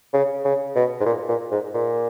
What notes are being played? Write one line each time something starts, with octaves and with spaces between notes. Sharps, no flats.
C#3
C#3
B2
G#2
A#2
A#2
G#2
A#2